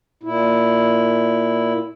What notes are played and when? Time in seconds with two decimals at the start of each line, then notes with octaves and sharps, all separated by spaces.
0.23 A#2 E4